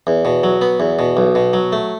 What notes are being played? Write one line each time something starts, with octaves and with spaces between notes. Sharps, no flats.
E2
B2
F#3
B3
E2
B2
B1
B2
F#3
A3